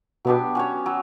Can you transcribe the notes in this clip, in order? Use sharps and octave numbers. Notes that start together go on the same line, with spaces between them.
B2 F#3 B3 D4 G4
C#4 F#4 C#5
F#3